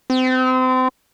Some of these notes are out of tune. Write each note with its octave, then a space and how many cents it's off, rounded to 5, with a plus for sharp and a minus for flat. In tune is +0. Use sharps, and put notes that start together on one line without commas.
C4 -30